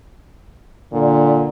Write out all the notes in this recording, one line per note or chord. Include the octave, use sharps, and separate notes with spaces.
A#2 D3